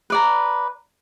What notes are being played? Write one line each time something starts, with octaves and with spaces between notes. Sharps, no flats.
B4 D5 A#5